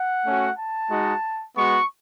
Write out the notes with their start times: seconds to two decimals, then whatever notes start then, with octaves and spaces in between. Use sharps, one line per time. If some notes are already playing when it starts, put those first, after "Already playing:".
Already playing: F#5
0.26 A3 C#4 F#4
0.58 A5
0.90 G#3 D#4 F#4
1.55 G#3 B3 F#4 C#6